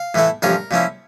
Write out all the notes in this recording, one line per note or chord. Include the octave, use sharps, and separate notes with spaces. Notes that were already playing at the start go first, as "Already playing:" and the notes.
Already playing: F5
A2 E3 A3 E4
A1 G2 F3 C#4 A#4
A#2 F3 C#4 E4